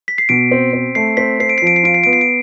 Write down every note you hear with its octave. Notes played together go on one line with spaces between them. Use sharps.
B6
C7
B2 D7
C4
C4
A3 C7
C4 B6
C4 C7
D7
C7
F3 D7
C7
F4 D7
C7
B3 D7
C7
D7